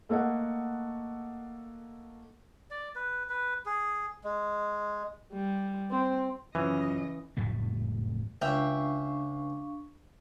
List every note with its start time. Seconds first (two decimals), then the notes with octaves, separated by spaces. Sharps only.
0.09 A3 A#3 A4 D#5 F#5
2.71 D5
2.96 B4
3.29 B4
3.66 G#4
4.24 G#3
5.33 G3
5.91 C4
6.55 F#2 C#3 E3 F3 C#4 D#5
7.37 F#1 F2 A2 A3
8.42 C#2 D4 E5 F5 G5 C#6